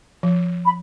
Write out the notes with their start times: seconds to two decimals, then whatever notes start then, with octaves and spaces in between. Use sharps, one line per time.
0.23 F3
0.65 B5